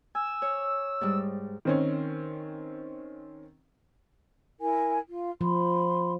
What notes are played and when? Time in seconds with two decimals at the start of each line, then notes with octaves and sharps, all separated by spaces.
0.15 G#5 E6
0.42 C#5
1.01 G#2 G3
1.65 D#3 C4 C#4
4.60 E4 A#4 G#5
5.08 F4
5.41 F3 B5 C6